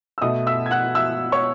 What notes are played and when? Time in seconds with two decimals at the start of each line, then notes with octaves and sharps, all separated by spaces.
0.18 E6
0.21 B2 A3 D#5 D#6
0.47 E5 E6
0.66 G#6
0.71 F#5 F#6
0.95 E5 E6
1.32 C#5 C#6